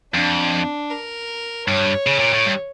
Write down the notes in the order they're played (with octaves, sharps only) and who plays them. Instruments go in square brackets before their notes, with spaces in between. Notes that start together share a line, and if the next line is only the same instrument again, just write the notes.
[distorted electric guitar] F2 [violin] D4
[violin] A#4
[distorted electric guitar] G2 [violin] C#5
[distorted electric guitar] C#3
A#2
A2
G2